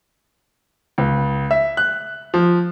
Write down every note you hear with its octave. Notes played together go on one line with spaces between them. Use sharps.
C#2
E5
F#6
F3